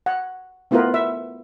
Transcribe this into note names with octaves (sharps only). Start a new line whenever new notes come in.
F#5
A3 B3 E4 F4 A#4 B4
E5